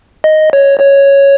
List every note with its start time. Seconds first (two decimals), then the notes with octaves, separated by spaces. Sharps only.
0.24 D#5
0.53 C#5
0.80 C#5